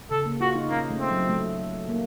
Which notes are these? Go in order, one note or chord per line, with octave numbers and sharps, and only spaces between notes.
C#3 A4
A#3
F4 F#4
D#4
A#3 C#4
A3
C4
F#3
A3
A#3